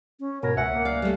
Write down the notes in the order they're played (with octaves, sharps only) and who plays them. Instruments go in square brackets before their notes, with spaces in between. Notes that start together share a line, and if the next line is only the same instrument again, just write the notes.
[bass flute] C#4
[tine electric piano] G#2 B2 [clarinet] A#4 [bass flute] C#5
[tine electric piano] C#2 E5 G#5 [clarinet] F#5
[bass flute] A#3
[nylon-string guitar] D5 [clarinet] F5
[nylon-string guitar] G3 A3